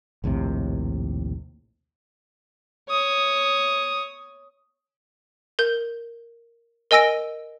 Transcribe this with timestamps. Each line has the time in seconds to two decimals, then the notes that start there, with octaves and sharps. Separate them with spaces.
0.24 A#1 D#2 A2 C3
2.90 C#5 D#6
5.59 A#4 G6
6.91 A#4 D#5 G#5 E6 A#6 D7